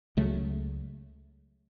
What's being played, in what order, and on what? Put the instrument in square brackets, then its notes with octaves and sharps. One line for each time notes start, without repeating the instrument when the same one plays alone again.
[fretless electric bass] C#2 C#3 F#3 A3